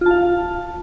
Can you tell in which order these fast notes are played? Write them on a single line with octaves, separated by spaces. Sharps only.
F4 A5 F5